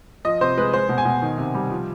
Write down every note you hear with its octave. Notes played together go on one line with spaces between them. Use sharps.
F3 D#5
C3 C5
G#3 B4
G#3 C5
B2
G#5
B2
D#3
C3
G3
F3